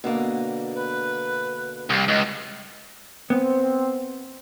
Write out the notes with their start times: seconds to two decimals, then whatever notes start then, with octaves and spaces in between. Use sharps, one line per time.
0.04 B2 D3 A#3
0.74 B4
1.90 C2
2.08 C#2 D#5
3.30 B3 C4